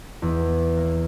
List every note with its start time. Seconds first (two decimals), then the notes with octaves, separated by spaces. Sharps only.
0.22 E2
0.77 A#3